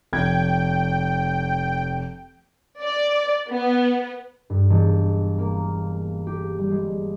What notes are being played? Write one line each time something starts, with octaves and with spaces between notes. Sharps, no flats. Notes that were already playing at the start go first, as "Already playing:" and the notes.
F1 G5 G#6
D5
B3
G2
E1
A#3
G4
G3
G#3